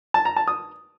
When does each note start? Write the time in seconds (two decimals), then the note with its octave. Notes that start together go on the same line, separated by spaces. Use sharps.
0.14 A5
0.25 A#5
0.36 A5
0.48 D#6